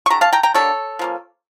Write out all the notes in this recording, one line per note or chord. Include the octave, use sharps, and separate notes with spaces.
C#6
D3 G3 A#5
F5 A5
G5 A#5
G5 A#5
D3 G3 A#3 D4 A4 C#5
F3 A#3 C#4